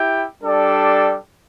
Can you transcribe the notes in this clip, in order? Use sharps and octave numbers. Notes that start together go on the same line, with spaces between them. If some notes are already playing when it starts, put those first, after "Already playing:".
Already playing: E4 G4 G5
G3 D4 A4 D5